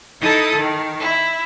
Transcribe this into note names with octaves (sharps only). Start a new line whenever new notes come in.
D#4 E4 A4 A5 D#6
D#3
E4